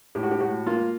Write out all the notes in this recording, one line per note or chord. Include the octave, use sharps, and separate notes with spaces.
A2 G4
F#4
G4
A2 F#4
A#3 F4